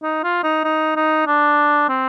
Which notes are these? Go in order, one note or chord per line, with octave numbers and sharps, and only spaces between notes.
D#4
F4
D#4
D#4
D#4
D4
C4